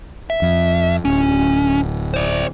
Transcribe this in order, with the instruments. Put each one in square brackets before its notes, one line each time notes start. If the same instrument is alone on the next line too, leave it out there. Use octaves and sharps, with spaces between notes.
[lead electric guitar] E5
[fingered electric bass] F2
[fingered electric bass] D1 [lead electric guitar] C#4
[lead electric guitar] C5 D5